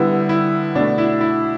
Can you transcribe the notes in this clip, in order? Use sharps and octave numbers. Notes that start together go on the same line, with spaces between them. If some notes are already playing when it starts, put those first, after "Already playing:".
Already playing: D3 G3 B3 E4
E4
B2 A3 D4
E4
E4